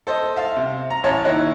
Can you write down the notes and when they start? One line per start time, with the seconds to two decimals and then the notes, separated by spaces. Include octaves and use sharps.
0.07 A4 C5 D#5
0.36 E5 F5 A5
0.56 C3
0.90 A#5
1.03 A1 C#5 A5 A#5
1.24 D#3 A#3 E4 C#5 D#5 F#6